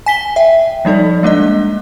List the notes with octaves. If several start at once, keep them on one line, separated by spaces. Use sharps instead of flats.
G#5 B6 G7
E5 G5
F3 G3 D#4 A4 D5
G#3 A#3 D4 D#5